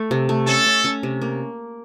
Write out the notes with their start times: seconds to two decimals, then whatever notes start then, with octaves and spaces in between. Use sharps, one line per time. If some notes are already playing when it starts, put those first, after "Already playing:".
Already playing: A3
0.11 C3
0.29 A3
0.47 C#4 A4
0.66 C#4
0.85 C#4
1.03 C3
1.22 A#3